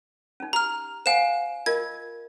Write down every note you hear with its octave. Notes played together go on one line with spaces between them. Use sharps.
C#4 D#4
G4 A#5 F6
C5 F5 F#5 G#5 E7
F4 A#4 D#5 G#6